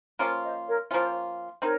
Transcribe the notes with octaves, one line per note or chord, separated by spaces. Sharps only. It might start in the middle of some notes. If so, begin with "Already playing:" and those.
F3 A#3 C#4 F4 A#4 C#5
C5 D#5
A#4 C#5
F3 A#3 C#4 F4 C5
C4 D#4 A#4 C#5